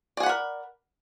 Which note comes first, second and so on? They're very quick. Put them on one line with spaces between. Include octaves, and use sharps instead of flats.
D5 G#4 F#5 B5 A#4